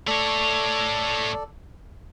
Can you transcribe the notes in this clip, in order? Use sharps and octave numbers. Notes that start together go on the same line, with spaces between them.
A3 A4 C#5 D5